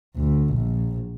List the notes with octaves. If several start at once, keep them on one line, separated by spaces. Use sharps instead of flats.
D2
A#1